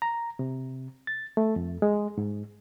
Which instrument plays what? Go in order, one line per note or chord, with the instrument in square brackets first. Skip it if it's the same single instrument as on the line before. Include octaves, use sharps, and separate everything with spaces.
[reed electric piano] A#5
C3
A6
A3
F2
G#3
G#2